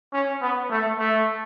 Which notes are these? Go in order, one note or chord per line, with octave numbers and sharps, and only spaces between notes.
C#4
B3
A3
A3